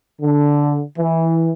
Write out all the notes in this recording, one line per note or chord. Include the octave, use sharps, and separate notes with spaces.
D3
E3